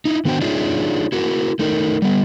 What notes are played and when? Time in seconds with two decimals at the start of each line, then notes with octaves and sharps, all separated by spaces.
0.05 D#4 E4
0.25 D#3 B3 D4 F#4 C5 G5
0.41 D4 D#4 F4 G#4 C#5 E5
1.12 E4 F#4 A#4
1.59 A3 D#4 A#4
2.02 G3 B3